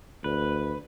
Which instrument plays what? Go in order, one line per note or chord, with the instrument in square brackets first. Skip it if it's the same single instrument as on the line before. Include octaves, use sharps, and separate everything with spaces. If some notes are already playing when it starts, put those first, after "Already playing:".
[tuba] D2 [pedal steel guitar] B4